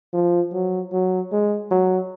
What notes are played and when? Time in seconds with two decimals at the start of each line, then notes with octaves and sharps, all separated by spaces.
0.13 F3
0.52 F#3
0.93 F#3
1.32 G#3
1.71 F#3